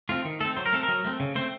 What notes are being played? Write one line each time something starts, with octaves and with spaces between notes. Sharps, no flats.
A3 C4 F4
D#3
A3 C4 A4
F#3 C5
A#4
A3 C4 A4
A#4
F#3
A3 C4
C#3
A3 C4 C5